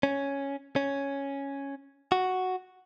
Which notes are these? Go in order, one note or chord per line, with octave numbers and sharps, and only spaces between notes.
C#4
C#4
F#4